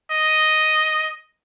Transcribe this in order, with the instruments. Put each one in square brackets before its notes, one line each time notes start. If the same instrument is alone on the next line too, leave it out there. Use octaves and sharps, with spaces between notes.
[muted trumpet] D#5